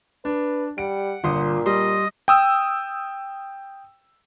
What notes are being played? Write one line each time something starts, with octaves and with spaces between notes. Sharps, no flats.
D4 B4
G3 F#5 D7
G1 A#2 F4 C6 D#6
G3 D#5 C6 D#6
G5 D#6 E6